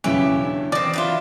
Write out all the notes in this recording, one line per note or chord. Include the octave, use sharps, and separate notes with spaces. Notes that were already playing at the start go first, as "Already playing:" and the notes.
B1 E2 C#3 E3 C#4 E4 G4 C#5
D4
D#3 E3 C4 D5
F#3 E4 F4